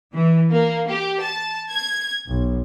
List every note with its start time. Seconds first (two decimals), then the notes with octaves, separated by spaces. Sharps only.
0.13 E3
0.52 A#3
0.89 G4
1.21 A5
1.71 G#6
2.28 B1